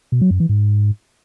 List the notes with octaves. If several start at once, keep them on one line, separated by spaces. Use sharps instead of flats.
B2
F#3
F#2
E3
G#2